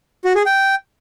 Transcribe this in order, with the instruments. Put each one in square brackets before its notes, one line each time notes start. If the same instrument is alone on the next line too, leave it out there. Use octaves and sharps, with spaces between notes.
[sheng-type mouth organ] F#4
G#4
G5